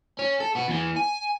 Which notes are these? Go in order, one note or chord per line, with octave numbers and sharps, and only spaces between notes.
C#4
A4
B3 F#4
E2 E3
G#5